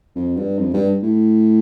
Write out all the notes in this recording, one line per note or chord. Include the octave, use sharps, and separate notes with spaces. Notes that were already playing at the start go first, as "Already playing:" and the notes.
F2
G2
F2
G2
A2